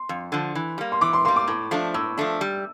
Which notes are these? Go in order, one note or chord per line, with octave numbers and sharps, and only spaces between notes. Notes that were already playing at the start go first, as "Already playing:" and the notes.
Already playing: C6
F2
D3 F3
E3
G3 A#3
C6
E3 D6
C6
G3 A#3 C6
D6
A2
F3 A3 D4
A2 E6
F3 A3 D4
G3